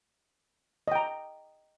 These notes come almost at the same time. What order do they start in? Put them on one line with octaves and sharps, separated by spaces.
D#5 G5 A#5